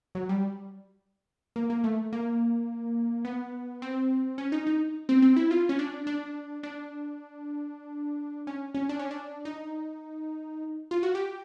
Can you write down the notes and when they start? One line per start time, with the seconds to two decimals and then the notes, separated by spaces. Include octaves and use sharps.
0.15 F#3
0.29 G3
1.56 A#3
1.70 A#3
1.84 A3
2.13 A#3
3.25 B3
3.82 C4
4.38 C#4
4.52 D#4
4.67 D#4
5.09 C4
5.22 C4
5.36 E4
5.51 F4
5.69 C#4
5.79 D4
6.07 D4
6.63 D4
8.47 C#4
8.75 C#4
8.89 D4
8.99 C#4
9.11 D4
9.45 D#4
10.91 F4
11.03 F#4
11.15 G4